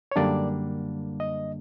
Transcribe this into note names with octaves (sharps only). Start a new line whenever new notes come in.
C#5
F#2 D3 G3 A#3 D4 D5
D#5